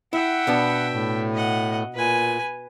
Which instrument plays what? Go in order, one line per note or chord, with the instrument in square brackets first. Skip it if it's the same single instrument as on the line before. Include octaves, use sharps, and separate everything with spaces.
[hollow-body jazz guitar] E4 [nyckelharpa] E5 G5 [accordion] F#5
[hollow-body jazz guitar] B2 B3 D4
[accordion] A2
[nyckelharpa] D#5 F#5
[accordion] A#2 [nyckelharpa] B4 G#5